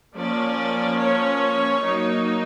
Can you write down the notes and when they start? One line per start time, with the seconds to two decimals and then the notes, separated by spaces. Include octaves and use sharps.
0.16 F3 A#3 C#4 D5
0.99 C#5
1.82 F#3 A#3 D#4